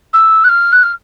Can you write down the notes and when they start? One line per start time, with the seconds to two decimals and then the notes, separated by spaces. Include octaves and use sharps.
0.13 E6
0.44 F#6
0.49 F6
0.72 F#6
0.83 F6